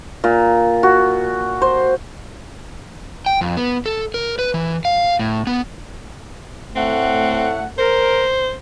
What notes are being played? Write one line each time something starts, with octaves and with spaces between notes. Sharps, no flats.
A#2
F#4
C5
G5
F2
B3
A4
A#4
B4
E3
F5
A2
B3
A2 A3 C4 F#5
A#4 C5